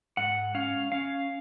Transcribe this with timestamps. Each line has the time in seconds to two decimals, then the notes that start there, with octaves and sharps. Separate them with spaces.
0.17 G#2 F#5
0.55 C#4 F5
0.92 C#4 F5